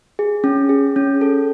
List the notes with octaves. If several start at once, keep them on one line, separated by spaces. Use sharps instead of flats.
G#4
C#4
G#4
C#4
A4